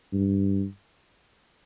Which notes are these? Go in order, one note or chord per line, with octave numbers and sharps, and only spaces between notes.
G2